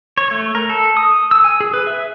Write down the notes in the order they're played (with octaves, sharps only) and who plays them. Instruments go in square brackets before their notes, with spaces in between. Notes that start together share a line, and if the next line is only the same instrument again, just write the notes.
[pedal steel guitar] C#5
A3
A#4
A4
D#6
E6
G#5
G#4
B4
E5